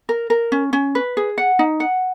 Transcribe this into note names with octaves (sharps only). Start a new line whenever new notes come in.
A#4
A#4
C#4
C#4
B4
G#4
F#5
D#4
F#5